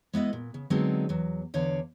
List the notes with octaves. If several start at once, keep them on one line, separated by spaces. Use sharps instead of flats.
G#3 B3 E4 D#5
A#2
C#3
D3 F#3 G#3 B3 C4 D#4
E2 F#3
E2 D3 C#5 F5